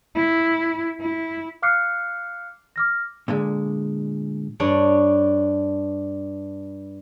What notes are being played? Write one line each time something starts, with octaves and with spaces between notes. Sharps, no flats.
E4
E4
F5 D6 F6 F#6 C7 C#7
D6 F6 A#6
A#2 D3 G#3
G2 D4 C#5